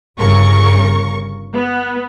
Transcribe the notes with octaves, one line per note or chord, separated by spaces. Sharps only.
G1 C#3 A#4 C#6
B3